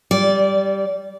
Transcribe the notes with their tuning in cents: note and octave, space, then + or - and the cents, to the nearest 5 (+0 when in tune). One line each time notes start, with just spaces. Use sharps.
G3 +0 D5 -20